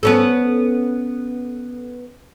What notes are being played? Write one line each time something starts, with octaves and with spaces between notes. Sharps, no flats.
B3 C#4 A4